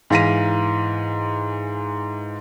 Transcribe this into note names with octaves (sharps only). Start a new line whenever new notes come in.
G#2 E3 F5 A#6 B6 D#7